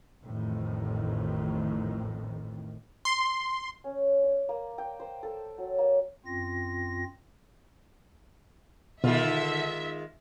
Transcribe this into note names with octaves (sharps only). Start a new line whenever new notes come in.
A1 F2 A2 D#3
C6
C#4
D5
A#3
G5
C5
A4
F#3
A#3
F#2 C4 F4 A#6
B2 D3 D#3 G#3 F4 E5